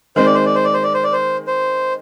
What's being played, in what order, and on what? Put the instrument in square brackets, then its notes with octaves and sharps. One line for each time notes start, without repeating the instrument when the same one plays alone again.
[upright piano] D#3 G#3 C4 [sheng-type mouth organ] C5
[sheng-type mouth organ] D5
C5
D5
C5
D5
C5
D5
C5
D5
C5
C5